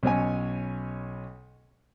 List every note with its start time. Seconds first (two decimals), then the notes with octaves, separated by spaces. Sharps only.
0.03 B1 B2 C#4 C#5 G#5